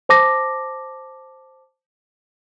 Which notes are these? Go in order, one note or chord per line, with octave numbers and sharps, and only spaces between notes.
C5 A5 D6 A#6